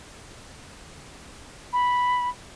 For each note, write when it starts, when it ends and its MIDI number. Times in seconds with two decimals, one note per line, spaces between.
1.73 2.29 83